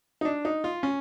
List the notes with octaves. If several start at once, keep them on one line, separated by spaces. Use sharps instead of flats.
D#4
D4
D#4
F4
C#4